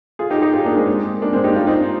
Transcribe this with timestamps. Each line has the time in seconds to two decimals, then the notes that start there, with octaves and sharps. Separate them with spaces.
0.19 F4 G#4
0.30 D#4 G4
0.42 D#4 G4
0.53 F4 G#4
0.65 A#3 D4
0.76 G#3 C4
1.22 A#3 D4
1.33 G#3 C4
1.44 D#4 G4
1.55 D4 F4
1.67 C4 D#4